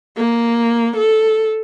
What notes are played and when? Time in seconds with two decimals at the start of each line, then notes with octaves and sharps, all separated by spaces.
0.17 A#3
0.97 A4